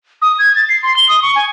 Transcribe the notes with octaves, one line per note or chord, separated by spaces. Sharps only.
D#6
G#6
A6
C7
C6
G7
D#6
C#6
G#5